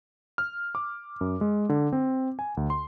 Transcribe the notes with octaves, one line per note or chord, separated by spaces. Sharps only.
F6
D6
F#2
G#3
D3
C4
G#5
D2
C6